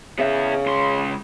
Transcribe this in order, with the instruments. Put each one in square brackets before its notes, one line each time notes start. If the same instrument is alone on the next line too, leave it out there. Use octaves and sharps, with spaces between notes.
[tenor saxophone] C#3 [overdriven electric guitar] B3 E5
[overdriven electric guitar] C#2 C6